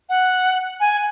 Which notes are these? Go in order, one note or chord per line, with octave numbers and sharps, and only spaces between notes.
F#5
G#5